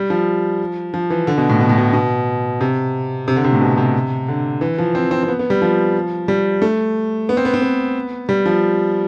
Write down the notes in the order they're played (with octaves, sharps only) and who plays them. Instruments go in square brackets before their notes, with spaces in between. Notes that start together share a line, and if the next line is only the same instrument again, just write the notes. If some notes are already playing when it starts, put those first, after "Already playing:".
Already playing: [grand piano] G3
F3
F3
E3
D3
B2
A2
B2
A2
B2
B2
C3
C3
D3
C3
A2
B2
C3
D3
E3
F3
C4
C4
C4
B3
B3
G3
F3
G3
A3
B3
C4
B3
C4
B3
G3
F3